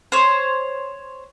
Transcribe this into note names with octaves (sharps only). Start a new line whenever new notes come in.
C5 C#5